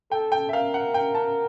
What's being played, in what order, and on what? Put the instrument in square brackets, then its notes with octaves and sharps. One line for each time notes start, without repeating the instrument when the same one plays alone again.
[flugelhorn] A4 [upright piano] G5
[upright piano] G5
E5
[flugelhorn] A#4 [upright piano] F5
[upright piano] F#5
G5
A5